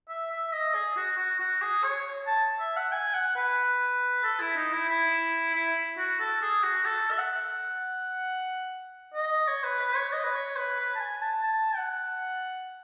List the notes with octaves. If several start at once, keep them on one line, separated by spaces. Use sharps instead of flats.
E5
E5
D#5
G#4
F#4
F#4
F#4
G#4
C#5
A5
E5
F#5
G#5
F#5
B4
A4
E4
D#4
E4
E4
E4
F#4
A4
G#4
F#4
A4
E5
F#5
D#5
C#5
B4
B4
C#5
D#5
B4
C#5
B4
B4
A5
G#5
A5
A5
F#5